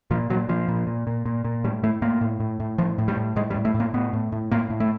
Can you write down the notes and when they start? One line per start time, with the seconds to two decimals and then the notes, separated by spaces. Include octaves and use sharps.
0.11 A#2 F3
0.30 A#2 F#3
0.49 A#2 F3
0.68 A#2
0.87 A#2
1.07 A#2
1.26 A#2
1.45 A#2
1.64 A2 G3
1.83 A2 A3
2.02 A2 A#3
2.21 A2
2.40 A2
2.60 A2
2.78 A2 F3
2.98 A2
3.08 G3
3.17 A2
3.36 A2 G#3
3.50 G3
3.56 A2
3.65 A3
3.75 A2
3.80 A#3
3.94 A2 B3
4.13 A2
4.32 A2
4.51 A2 A#3
4.70 A2
4.80 A3